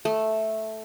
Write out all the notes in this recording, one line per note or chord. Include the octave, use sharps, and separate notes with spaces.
A3